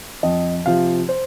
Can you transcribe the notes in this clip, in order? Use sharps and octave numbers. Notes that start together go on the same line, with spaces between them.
F2 D#5
C3 F3 F5
C5